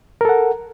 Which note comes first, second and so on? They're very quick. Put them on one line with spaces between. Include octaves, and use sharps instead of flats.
A#4 A4 F#5